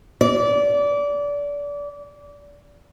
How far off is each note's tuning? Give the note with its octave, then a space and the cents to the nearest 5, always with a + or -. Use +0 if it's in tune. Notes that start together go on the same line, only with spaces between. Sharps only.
D5 -25